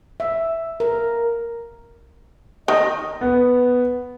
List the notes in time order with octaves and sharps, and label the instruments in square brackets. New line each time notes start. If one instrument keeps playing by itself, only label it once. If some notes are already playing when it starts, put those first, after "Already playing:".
[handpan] E5
A#4
[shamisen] D#3 [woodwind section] D#5
[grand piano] B3